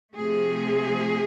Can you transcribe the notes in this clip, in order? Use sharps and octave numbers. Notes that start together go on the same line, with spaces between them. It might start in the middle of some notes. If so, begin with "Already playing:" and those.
C3 F3 A3 G#4